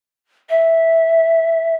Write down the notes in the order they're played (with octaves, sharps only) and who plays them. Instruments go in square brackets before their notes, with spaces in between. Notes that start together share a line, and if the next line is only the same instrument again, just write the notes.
[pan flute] E5